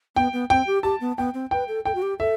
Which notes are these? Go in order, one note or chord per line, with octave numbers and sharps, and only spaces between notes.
B3 G5
B3
C4 G5
G4
G4 A5
B3
B3 G5
C4
B4 G5
A4
A4 G5
F#4
G4
A4 E5